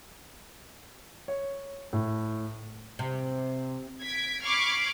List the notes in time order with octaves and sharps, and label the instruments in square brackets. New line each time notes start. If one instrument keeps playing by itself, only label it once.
[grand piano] C#5
A2
[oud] C3
[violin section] G#6 B6 D7
B5 C#6 D6 F6 G#6 C7